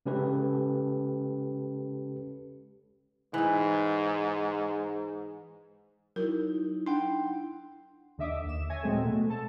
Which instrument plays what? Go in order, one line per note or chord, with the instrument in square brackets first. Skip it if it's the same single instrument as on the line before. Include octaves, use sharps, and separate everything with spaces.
[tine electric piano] C#3 G#3 C#4 G4 A4 B4
[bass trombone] G#2 [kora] E3 D#4
[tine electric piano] F#3 [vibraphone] D#4 E4 [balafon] A#4
[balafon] D4 [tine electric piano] F#5 G5 C6
[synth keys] D#2 D3 D#5 E5 D6 D#6
D#2 E7
C#5 E5 G#5 G#6 A#6
A#2 F#3 G#3 C4 A4
B2 A3 B3
A4 A5